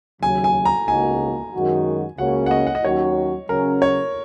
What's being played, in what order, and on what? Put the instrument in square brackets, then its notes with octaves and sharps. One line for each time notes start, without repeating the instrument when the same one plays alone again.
[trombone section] D#2 C#3 F#3 [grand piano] G#5
[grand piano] G#5
A#5
[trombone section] C#2 C#3 A#3 D#4 F#4 [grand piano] G#5
[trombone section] F#2 D#3 G#3 F#4
[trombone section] C#2 C#3 A#3 C#4 F#4 [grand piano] F#5
[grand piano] F#5
D#5
F#5
D#5
[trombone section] D#2 D#3 F#3 C#4 F#4 [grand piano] C#5
[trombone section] C#3 F#3 C#4 [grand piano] A#4
[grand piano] C#5